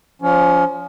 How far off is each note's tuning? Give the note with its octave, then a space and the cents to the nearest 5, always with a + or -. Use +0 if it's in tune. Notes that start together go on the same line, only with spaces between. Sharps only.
F3 +0 C#4 +30